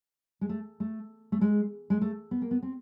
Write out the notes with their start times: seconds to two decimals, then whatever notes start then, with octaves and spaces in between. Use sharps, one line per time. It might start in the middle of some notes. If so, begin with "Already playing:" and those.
0.41 G#3
0.49 A3
0.80 A3
1.32 A3
1.41 G#3
1.90 G#3
2.02 A3
2.31 B3
2.42 A#3
2.51 B3
2.63 C4